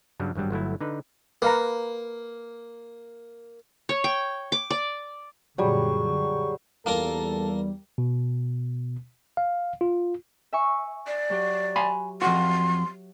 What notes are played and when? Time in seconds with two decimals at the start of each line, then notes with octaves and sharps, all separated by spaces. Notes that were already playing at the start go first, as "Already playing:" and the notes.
0.20 G2 C#3 F#3 G3
0.35 G#1 G2 F#3 G3
0.51 G1 F#3 A3 E4
0.80 D3 D#4 B4
1.42 A#3 B4 F5 A#5
3.89 C#5
4.04 G5
4.52 D6
4.70 D5
5.58 F#2 A#2 D3 F#3 G3 G#4 C#6
6.86 E2 G3 A#3 F4 A4 A#4
7.98 B2
9.37 F5
9.81 F4
10.53 E5 G#5 C#6
11.07 D5
11.30 F#3 G4
11.76 G#5 B5 C6
12.22 F2 F#4 C6